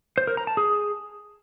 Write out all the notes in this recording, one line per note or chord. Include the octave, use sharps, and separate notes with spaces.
C5
A#4
A#5
A5
G#4